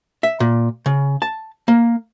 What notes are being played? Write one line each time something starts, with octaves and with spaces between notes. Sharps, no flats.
E5
A#2
C#3
A5
A#3